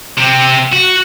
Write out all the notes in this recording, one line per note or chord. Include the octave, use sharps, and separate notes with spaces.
C3 C4
F#4